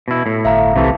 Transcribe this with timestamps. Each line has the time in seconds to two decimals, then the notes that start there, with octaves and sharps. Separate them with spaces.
0.08 B2 E4
0.26 A2
0.45 G1 E5 F5 A#5
0.76 C2 C3 E3 A3